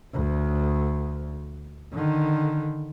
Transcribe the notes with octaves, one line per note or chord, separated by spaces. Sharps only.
D2
D3 D#3